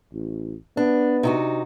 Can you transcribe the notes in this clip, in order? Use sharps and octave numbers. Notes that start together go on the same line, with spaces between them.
A1
B3 D4
C3 D#4 F#4